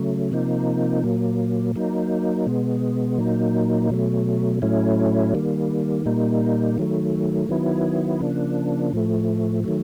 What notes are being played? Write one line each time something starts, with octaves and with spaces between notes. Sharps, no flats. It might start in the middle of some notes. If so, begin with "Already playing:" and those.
Already playing: C#3 F#3 A3
C3 F3 A#3 D#4
A#2 F#3 A#3
F#3 A#3 D#4
B2 G#3 B3
A#2 F#3 A#3 D#4
B2 F#3 A3
A2 F#3 A3 C#4 E4
D#3 G3 A#3
A#2 G3 A#3 D#4
D#3 F#3 A3
D#3 F#3 B3 E4
C#3 F3 A#3 D4
A2 F3 A3
D#3 F#3 A3